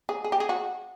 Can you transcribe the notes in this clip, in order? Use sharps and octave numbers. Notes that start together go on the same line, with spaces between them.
G#4
G#4
G4
G#4
F#4